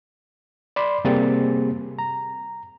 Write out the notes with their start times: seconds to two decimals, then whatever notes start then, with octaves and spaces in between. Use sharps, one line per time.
0.76 D5 B5 C6
1.05 C3 G3 A#3 C4 G#4 A6
1.99 A#5